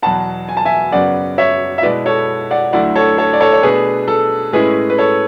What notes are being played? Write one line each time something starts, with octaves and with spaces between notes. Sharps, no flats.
E2 B2 F#3 F#5 A5
G#5
A5
E5 G#5
F#2 C#3 F#3 B3 D5 F#5
C#5 E5
E5
B2 G#3 B3 E4 B4 D5
A4 C#5
D5 F#5
D2 D3 F#3 A3 E4 D5 F#5
A4 C#5
A4 C#5
D5
A4 C#5
C#5
B2 A3 D4 G#4 B4
A4
A2 G#3 C#4 E4 G#4 B4
B4
A4 C#5